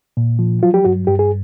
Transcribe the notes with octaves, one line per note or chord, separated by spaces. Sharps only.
A#2
F3
F#3 F4
G4
G2 F#4
G2 G4
G#4